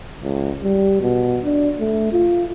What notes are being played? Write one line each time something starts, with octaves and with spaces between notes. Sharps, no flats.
C#2
G3
B2
D4
A3
F4